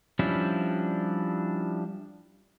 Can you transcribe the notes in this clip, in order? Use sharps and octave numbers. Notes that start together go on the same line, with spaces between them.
F3 G3 C#4 D4 E4